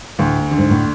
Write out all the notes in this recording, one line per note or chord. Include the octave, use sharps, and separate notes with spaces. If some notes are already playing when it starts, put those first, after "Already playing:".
D2 A2
D3
G#2
A2